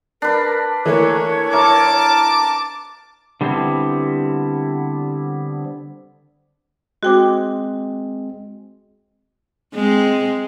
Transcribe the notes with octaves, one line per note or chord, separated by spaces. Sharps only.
D4 A#4 B4
E3 A3 A#3 C#5
E4 A#4 A5 D6
D3 G3 B3 C4 E4
G#3 C4 F#4 G5 D6
G#3 C4